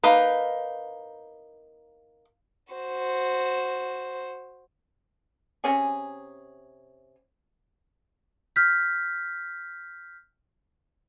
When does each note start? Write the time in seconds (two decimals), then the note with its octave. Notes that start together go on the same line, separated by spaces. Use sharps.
0.04 A#3 D#4 B4 F5
2.73 F#4 C5
5.64 C3 C#4 G#4
8.56 F6 G6 B6